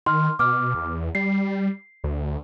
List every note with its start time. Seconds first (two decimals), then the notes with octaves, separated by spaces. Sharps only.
0.06 D#3 C6 F6
0.39 B2 D6 F6
0.74 E2
1.15 G3 C7
2.04 D2